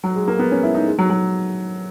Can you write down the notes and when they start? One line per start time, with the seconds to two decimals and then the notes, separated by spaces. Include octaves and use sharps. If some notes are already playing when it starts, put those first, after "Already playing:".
0.04 F#3
0.16 G#3
0.28 A#3
0.39 B3
0.51 C#4
0.63 E4
0.74 D#4
0.87 G#3
0.99 F#3
1.10 F#3